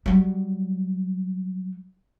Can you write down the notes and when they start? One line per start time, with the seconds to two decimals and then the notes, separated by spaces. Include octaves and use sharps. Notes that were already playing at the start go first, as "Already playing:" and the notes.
0.06 F#3 G3